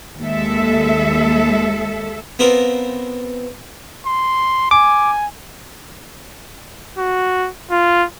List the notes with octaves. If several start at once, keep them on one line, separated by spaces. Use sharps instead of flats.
D#2 G#3 A4 E5
B3 C4 F4 A#4
C6
G#5 D6
F#4
F4